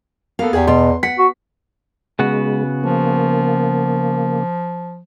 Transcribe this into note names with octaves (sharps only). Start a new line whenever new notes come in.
A#3 B3 A4 F5
E2 G4 G#4
B2 C6
F#5 B6
F#4
C#3 G#3 B3 F#4
F3 A#3